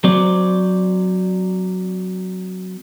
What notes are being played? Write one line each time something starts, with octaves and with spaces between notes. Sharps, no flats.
F#3 C4 D5